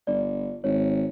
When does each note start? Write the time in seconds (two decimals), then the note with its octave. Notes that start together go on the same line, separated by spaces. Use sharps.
0.07 G1 D5
0.64 G#1 C#5